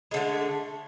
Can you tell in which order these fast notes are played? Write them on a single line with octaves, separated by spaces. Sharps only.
G#3 D3 A3